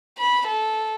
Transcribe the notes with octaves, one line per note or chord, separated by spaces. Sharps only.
B5
A4